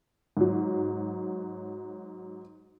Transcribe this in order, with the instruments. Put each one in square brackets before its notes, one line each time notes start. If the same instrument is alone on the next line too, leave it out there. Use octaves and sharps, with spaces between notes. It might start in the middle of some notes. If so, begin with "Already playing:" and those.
[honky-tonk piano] G#2 F#3